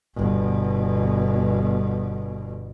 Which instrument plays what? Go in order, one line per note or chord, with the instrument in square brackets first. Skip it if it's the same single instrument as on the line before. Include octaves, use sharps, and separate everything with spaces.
[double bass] G1 B2